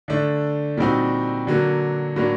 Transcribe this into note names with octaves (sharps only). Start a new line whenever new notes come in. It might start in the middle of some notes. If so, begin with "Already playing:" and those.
D3 A3 D4
A#2 G3 C4 D#4 F#4
D3 F#3 A#3
A2 F#3 A#3 D4